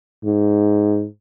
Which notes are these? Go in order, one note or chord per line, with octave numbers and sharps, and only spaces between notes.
G#2